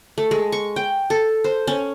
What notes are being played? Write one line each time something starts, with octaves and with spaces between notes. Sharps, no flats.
A3
G#3
C#6
G5
A4
C5
C#4